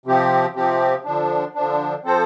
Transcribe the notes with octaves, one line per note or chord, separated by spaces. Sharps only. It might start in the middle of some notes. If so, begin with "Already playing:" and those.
C3 F3 C4 G4
C3 F3 C4 G4
D3 F3 D4
D3 F3 D4
F3 C4 A4 C5